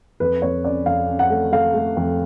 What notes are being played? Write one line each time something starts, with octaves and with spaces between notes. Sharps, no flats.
F2 B4
F2 C#5
C#4 D5
F2 F5
C#4
F#5
A3
A3 F5
A3
F2